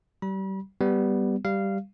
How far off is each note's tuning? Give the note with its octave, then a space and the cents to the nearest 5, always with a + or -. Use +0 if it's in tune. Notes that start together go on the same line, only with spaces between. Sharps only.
G3 -30 B5 -40
G3 +0 B3 +5
G3 +0 F5 -15